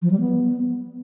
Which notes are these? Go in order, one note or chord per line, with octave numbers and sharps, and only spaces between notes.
F3
G3
B3